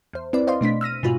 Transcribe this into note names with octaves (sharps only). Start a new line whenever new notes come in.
E2 C5
C4 E4 B4 D5
C5 D5 D#5 F5 C6
B2 A3 D4 B6
E6 F6 A#6 D#7
G#2 B2 D#4 F4 F#4